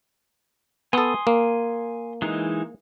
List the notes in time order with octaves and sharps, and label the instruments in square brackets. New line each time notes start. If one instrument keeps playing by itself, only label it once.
[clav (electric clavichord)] B3 A4 [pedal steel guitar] G#5 C6 D#6
[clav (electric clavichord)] A#3
[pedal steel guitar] E3 G#3 D#4